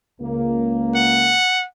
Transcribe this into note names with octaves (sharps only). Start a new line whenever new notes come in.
C#2 A#3
F#5